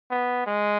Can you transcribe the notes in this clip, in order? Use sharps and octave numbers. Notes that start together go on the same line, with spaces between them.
B3
G#3